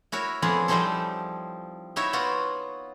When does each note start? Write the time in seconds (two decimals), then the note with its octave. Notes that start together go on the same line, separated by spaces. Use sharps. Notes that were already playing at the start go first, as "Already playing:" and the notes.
0.12 E4 F#4 A#4 C#5
0.42 F2 B3 E4 F4 G#4
0.68 F3 G3 C4 D#4 E4 A4
1.96 D#4 E4 F#4 C#5 E5
2.13 B3 F4 F#4